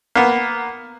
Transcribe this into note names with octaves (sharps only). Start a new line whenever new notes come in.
A#3 B3